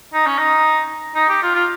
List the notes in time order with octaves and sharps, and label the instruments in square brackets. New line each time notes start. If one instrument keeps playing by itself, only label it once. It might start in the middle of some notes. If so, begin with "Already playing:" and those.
[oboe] D#4
C#4
D#4
D#4
G4
F4
F4